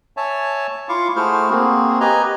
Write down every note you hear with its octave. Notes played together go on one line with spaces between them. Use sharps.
C#5 E5 G#5 A5
E4 F4 F5 C#6 D6
A3 E4 F#4 G#4 C5 F6
A#3 C4 F#4 G#4
G4 B4 D#5 G#5 A#5